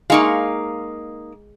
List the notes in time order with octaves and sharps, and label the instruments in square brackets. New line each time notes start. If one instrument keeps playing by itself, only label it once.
[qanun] G#3 C#6 [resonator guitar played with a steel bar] A#3 D#4 F5